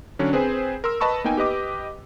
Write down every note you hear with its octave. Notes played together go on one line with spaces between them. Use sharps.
D3 F#3 C#4 D4
C4 G#4 B4 C5 G#5
A#4 C6 E6
B4 D#5 A5 B5 C#6 E6
A#3 B3 D#4 G5 G#5
G4 B4 D#5 D6